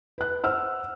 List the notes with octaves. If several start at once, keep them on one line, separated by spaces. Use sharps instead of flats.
B4 F#6
C5 F#5 E6 F6